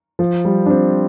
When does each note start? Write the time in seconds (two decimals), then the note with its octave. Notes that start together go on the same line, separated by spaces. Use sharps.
0.19 F3
0.45 G3
0.66 D4
0.70 C4